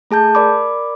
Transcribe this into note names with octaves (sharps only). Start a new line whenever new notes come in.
A3 G#4 A5 G6
A#4 D5 B5 D6